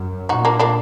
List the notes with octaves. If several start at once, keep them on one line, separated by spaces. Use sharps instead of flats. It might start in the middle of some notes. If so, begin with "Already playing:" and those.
Already playing: F#2
A#2 D#4 F#4
A#3 D4
A#3 D4